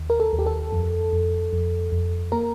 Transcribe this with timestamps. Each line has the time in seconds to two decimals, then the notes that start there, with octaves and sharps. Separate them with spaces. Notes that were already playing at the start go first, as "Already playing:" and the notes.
Already playing: D#2
0.10 A#4
0.20 A4
0.33 D#2
0.39 G4
0.46 A4
0.72 F2
1.13 F2
1.53 F2
1.92 F2
2.32 A#3 A#4